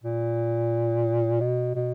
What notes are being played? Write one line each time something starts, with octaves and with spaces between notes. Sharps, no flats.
A#2
B2
B2